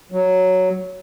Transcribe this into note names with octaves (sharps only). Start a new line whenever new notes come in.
F#3